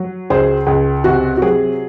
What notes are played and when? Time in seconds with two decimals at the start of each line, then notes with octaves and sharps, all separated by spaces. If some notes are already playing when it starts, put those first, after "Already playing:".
Already playing: F#3
0.30 C#2 G#4 C5
0.67 C#2 G#4
1.04 C3 F#4
1.37 F#4
1.42 F#3 G#4